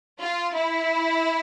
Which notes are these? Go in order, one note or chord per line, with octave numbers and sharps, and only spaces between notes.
F4
E4